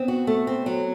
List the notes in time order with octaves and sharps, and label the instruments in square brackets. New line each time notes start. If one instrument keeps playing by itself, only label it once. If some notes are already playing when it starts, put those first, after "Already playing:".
Already playing: [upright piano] B3 [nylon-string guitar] C4
[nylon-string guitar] F#4
A3
C4
F#3